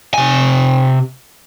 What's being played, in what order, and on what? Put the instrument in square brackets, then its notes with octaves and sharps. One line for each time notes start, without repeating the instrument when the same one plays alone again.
[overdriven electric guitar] C3 G#5